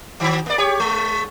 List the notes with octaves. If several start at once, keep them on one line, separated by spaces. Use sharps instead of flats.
D#3 F#3
A#3 D5
G4 C#5
G#3